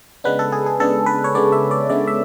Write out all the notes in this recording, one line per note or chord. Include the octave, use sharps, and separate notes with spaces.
C#3 G#3 B3 D4 B4
A4
G#4
G#4
C#3 G#3 B3 D4 A4
B4
C#5
C#3 G#3 B3 D4 D5
E5
D5
C#3 G#3 B3 D4 D5
E5